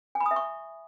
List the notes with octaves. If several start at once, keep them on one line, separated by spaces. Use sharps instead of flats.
G#5
B5
D#6
E5
C#6